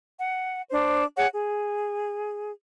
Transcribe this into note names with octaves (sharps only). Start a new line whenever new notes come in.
F#5
D4 C5
G#4 C#5 F#5
G#4